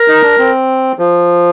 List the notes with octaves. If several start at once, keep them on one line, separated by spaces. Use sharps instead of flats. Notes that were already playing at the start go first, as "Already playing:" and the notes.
Already playing: A#4
D#4
D4
C4
F3